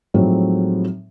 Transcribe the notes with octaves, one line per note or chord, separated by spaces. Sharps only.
A2 F3 F#3 G#3 C4 D#4